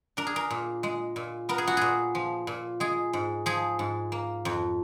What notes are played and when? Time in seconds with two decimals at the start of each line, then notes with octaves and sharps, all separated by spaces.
0.17 D4 A#4
0.27 G#4
0.36 A#4
0.50 A#2
0.83 G#3
1.16 A#2
1.49 B3 A#4
1.58 G#4
1.67 F#4
1.77 A#2 G#4
2.15 F3
2.47 A#2
2.80 G#3 G#4
3.13 G#2
3.46 F3 G#4
3.79 G#2
4.12 A#3
4.45 F2